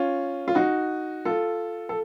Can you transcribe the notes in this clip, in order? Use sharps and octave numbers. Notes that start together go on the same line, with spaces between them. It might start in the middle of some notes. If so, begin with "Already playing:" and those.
Already playing: C#4 F4
F4
D#4 F#4
F4 A4
A4